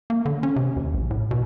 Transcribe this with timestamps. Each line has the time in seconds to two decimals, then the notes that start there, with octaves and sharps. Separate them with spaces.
0.10 A#3
0.25 D3
0.43 C#4
0.56 C3
0.76 D#2
0.94 A#1
1.11 A2
1.31 B2